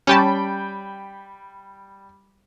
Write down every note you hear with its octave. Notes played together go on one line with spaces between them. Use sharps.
G3 C#4 G4 G5 A5 B5